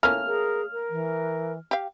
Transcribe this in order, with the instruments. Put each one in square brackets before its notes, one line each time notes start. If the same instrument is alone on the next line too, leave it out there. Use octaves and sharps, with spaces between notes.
[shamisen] A3 A#3 C#4 [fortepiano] F6
[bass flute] G#4 [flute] A#4
[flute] A#4
[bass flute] E3
[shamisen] G4 F5